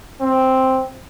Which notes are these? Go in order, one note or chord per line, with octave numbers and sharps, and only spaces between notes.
C4